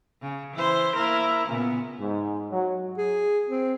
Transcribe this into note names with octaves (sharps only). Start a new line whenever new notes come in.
C#3
E3 E4 C5
A#3 E4 A#4
A#2 C#3 B3
G#2
F#3
G#4
C4